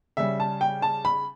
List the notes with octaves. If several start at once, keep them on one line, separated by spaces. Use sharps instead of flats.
C#3 G3 E5
A5
G5
A5
B5